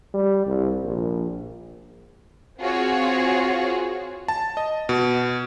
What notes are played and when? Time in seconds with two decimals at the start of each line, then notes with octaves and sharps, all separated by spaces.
0.14 G3
0.46 C2
0.84 A#1
2.59 C4 F4 F#4 G#4 C#5
4.28 A5
4.57 D#5
4.89 B2